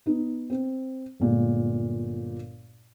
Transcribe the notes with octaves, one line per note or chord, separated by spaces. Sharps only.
B3 D#4
C4
G1 A#2 G#3